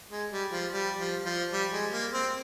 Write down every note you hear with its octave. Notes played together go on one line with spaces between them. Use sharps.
G#3
G3
F3
G3
F3
F3
G3
G#3
A#3
C4